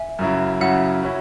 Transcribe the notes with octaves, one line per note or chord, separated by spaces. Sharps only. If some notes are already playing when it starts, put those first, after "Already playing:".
Already playing: E5 G#5
F#2 C#3 F#3 E4
F#2 C#3 F#3 E4 F#5
F#3 C#4 E4